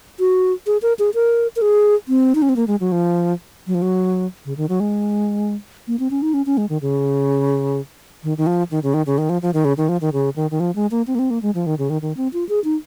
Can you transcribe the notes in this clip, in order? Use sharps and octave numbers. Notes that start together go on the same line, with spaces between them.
F#4
G#4
A#4
G#4
A#4
A#4
G#4
C4
D#4
C#4
C4
A#3
G#3
F#3
F3
F#3
F3
F#3
C#3
D#3
F#3
G#3
A#3
C4
C#4
D#4
C#4
C#4
G#3
D#3
C#3
D#3
D#3
F3
D#3
C#3
D#3
C#3
D#3
F3
F3
D#3
C#3
D#3
F3
D#3
C#3
D#3
D#3
F3
G#3
A#3
C4
A#3
C4
A#3
G#3
F3
D#3
C#3
D#3
D#3
C4
F4
G#4
D#4